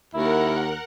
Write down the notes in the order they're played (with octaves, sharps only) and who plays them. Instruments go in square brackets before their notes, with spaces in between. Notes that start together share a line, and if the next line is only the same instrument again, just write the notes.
[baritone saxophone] D#2 [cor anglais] E4 [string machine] A#4 F#5